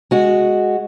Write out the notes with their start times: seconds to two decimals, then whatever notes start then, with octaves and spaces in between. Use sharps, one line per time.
0.11 G#3 F#4